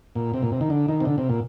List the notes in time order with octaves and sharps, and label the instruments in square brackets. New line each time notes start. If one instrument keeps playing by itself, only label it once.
[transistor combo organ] A#2
C3
A#2
C3
D#3
D3
D#3
C3
D3
C3
A#2